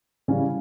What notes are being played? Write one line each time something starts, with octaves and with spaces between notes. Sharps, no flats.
C#3 E3 G3 C#4 F5 G#5